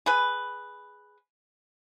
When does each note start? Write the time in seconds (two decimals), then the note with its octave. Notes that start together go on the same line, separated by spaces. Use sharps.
0.06 G#4 B4